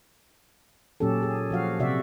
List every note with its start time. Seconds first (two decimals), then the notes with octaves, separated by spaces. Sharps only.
1.00 A#2 F#3 C#4 G4 A4
1.23 G#4
1.50 F3 F#4 F5
1.79 C3 F#4 D5 E5